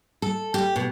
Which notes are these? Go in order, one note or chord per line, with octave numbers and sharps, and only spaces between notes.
A4
G4
B2